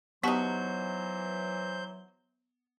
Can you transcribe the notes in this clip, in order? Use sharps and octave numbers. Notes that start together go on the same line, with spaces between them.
E3 F#3 B3 D#4 F#4 G4 C5 G6